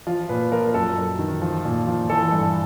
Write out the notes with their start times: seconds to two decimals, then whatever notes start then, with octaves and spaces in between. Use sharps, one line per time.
0.07 F3 F4
0.29 A#2 B4
0.51 F3 A#4
0.74 F#2 A4
0.97 F#2
1.19 D#3
1.42 F3
1.65 A#2
1.87 F3
2.10 E3 A4
2.32 G2